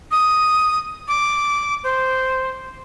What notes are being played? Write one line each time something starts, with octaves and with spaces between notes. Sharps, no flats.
D#6
D6
C5